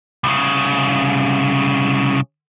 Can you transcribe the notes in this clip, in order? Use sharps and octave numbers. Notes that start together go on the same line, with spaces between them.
C2 C#3